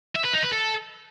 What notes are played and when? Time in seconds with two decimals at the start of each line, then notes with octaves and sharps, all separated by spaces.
0.16 E5
0.25 B4
0.34 D#4
0.43 B4
0.52 A4